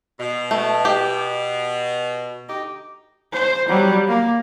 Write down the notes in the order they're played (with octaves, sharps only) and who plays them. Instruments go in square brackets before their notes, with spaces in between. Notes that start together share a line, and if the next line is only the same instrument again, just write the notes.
[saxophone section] B2
[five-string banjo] A3
G4
[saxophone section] D2 D#4 G4
[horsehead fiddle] C5
F#3 G3
A#3